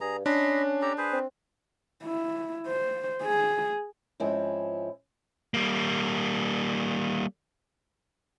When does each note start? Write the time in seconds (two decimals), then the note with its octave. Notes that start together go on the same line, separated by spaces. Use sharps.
0.01 G2 G#4 A#5
0.26 C#4 D4 D#5 B5 C6
0.82 G4 A4 A#5
0.98 G#4 B4 C5
1.13 C4
2.04 E4
2.67 C5
3.23 G#4
4.20 G#2 F3 C4 C#4 E4
5.54 G3 A#3